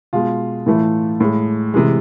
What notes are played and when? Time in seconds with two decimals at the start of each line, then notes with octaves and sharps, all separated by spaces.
0.13 B2 G#3 F4
0.66 A2 E3 A3
1.20 A2 G#3
1.74 C3 E3 G#3